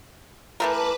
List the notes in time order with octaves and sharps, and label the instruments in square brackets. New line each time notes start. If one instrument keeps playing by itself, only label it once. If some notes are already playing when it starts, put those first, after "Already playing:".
[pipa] E3 A3 A#4 [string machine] B4 A5 D6